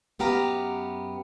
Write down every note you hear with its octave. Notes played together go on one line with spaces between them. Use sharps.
F#2 B3 G4 F5 A#5